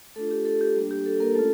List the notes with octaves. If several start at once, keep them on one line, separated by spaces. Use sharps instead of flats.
A3 D4 F4 A4
G4
A4
G4
G3 A#3 D4
G4
A4
A#3 A#4
A3 C#4 F4 A4